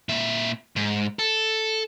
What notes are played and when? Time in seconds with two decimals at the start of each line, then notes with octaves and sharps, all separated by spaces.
0.09 A#2 E5
0.76 G#2
1.19 A4